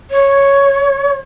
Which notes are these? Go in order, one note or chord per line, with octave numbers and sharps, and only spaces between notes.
C#5